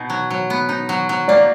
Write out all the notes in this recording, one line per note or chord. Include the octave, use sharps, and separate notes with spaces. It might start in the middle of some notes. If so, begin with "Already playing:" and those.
Already playing: B2 D#4
F#3
F#3
B3
D#4
F#3
F#3
A#3 D5